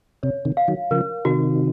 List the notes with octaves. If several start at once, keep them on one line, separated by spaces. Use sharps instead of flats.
C3 C#5
C3 D#3
F5
D#3 F#3
C#3 F3 A#4
C3 D#3 F#4